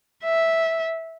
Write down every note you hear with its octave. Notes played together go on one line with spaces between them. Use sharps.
E5